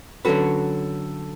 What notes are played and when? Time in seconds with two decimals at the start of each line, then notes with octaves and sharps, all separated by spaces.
0.25 D3 F#3 C#4 F#4 A4 B4